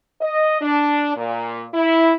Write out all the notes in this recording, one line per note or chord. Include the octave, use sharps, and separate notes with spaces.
D#5
D4
A#2
E4